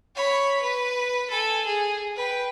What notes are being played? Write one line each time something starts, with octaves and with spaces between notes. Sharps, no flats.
C#5 B5
B4
A4 G#5
G#4
B4 G5